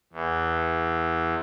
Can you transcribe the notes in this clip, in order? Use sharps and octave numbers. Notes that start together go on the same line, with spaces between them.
E2